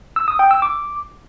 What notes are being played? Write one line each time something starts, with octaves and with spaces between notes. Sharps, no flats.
E6
D#6
G5
E6
D6